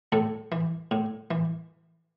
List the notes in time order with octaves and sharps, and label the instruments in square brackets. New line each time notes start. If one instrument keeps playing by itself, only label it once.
[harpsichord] A2 A4
E3
A2
E3